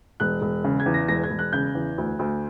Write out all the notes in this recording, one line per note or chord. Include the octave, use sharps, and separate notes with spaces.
E1 F#6
E1
C#3
G#6
E2
A#6
E1 A#6
G#6
E1
F#6
C#3 G6
E2
D2
D2